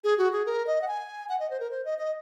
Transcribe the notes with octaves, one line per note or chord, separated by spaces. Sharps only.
G#4
F#4
G#4
A#4
D#5
F#5
G#5
F#5
D#5
C5
A#4
C5
D#5
D#5